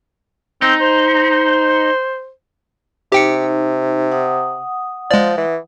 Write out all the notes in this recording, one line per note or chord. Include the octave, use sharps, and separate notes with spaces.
C4 D#4
C5
C3 D#4 G4 G5 C#7
F#5 D#6
F3 G#3 D5
E3